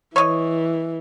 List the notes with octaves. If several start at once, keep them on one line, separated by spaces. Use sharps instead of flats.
E3 C#5 D#5